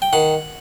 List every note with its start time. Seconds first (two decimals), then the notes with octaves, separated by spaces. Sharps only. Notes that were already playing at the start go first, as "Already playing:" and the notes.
0.02 G5
0.13 D#3 F#5